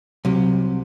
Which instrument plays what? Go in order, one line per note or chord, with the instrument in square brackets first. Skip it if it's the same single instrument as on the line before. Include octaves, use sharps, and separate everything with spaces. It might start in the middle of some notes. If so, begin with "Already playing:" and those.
[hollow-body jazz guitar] C2 C3 [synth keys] F#3